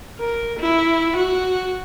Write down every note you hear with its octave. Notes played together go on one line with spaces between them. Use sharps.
A#4
E4
F#4